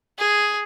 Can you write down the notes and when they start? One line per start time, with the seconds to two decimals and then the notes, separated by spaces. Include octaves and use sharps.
0.19 G#4